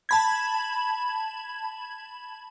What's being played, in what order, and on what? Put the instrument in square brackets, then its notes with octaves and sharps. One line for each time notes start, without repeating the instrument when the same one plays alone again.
[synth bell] A5 B5 G#6